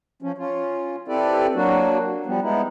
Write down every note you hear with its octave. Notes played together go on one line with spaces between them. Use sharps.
F3 C#4
C#4 F4
C4 E4 G4 A4 B4 D5
F#3 A#3 D4 F#4
F3 G3 B3
G#3 B3 D#4 E4